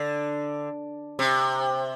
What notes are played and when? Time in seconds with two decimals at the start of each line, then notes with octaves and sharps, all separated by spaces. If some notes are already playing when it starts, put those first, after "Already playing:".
Already playing: D3
1.19 C3